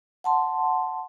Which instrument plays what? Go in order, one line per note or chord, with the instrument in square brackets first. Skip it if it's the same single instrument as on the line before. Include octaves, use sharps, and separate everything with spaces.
[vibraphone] F#5 A5 C6